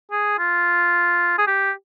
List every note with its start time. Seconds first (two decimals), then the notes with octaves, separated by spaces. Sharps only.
0.12 G#4
0.39 F4
1.38 G#4
1.47 G4